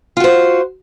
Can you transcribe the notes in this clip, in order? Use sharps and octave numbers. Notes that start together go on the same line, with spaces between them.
F4 F#4 C5